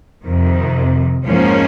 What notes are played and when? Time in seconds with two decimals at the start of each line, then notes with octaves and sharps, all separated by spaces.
0.24 F2 C3 D#3
1.24 G#2 F3 A#3 C#4